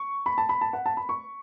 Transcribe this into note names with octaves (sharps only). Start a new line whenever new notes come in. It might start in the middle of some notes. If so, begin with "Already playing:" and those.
Already playing: C#6
B5
A5
B5
A5
F#5
A5
B5
C#6